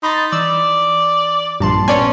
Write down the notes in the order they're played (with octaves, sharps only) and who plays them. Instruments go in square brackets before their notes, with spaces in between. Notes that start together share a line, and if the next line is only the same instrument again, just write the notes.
[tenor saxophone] D#4 [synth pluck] B5 C6 A6
[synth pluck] E3 [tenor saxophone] D5 [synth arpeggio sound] E6
[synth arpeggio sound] A#1 G2 [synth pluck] A#2 A5 C6
[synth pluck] B3 [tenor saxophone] C#4 [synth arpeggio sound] C#5 D5 G#5